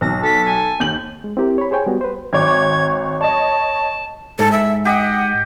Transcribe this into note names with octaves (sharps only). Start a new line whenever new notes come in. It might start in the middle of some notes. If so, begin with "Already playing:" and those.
B1 A#6
A4 B6
G#5
D#2 G6 F#7
G#3
C4 E4 G4 A#4
C#5 B5
G#4 C5 C#5 G5 G#5
G3 B3 F#4
B4 C5
G#1 C#5 D6 G#6
C#5 D#5 A5
G#2 A4
E5
G4 D#5 F#5